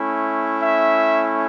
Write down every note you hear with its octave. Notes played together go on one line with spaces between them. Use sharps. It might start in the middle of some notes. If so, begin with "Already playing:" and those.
Already playing: A3 C#4 E4
E5